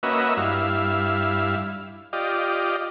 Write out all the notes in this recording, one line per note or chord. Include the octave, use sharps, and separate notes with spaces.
A#3 C#4 F#4 B4 D#5 E5
G2 E4 F5
F4 G4 D5 D#5